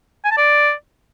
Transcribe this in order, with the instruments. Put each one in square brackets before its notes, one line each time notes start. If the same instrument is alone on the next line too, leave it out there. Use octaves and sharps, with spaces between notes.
[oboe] G#5
A5
D5